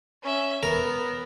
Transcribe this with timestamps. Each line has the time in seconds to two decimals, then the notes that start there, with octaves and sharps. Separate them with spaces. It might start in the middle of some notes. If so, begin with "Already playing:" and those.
0.22 C#4 E5
0.63 B3 A#4